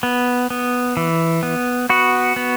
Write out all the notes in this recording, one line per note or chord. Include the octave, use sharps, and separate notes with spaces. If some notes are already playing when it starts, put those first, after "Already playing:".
B3
B3
E3
B3
B3 F#4
B3